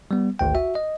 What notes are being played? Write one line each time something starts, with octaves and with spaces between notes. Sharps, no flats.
G3 B3
G#1 D2 G5
F#4 E5
D#5